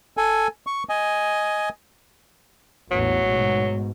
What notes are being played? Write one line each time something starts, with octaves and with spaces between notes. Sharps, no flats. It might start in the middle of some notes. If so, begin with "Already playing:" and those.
A4 G#5
C#6
D#5 G#5
A1 E2 F#3 B3
G#2 B2